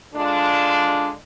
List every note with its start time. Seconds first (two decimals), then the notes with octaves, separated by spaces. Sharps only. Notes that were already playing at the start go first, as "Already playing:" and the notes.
0.12 D3 G#3 D4 F4